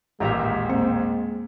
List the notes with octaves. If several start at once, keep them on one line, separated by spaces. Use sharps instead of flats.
A1 D#2 A#2 G#3 G4 E5 A#5
A#3 C4